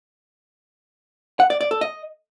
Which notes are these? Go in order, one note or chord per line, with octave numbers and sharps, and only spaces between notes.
F#5
D5
D5
A4
D#5